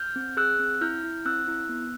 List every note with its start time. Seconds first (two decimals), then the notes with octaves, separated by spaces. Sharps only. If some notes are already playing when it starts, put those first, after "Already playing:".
Already playing: F6 G6
0.16 C4
0.37 G#4 E6 F#6
0.59 C4
0.81 E4 F6 G6
1.03 E4
1.25 C4 E6 F#6
1.48 E4
1.69 B3